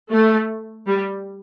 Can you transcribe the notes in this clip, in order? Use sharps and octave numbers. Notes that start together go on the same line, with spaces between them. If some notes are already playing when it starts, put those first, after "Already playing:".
A3
G3